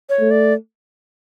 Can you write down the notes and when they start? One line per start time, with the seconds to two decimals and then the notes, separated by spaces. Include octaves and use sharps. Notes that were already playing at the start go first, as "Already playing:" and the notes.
0.09 C#5
0.20 A3
0.31 D5